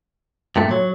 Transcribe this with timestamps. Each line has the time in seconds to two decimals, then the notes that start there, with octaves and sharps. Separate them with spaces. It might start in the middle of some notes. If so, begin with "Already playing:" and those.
0.56 G2 A#2 A3
0.71 F#3 C#5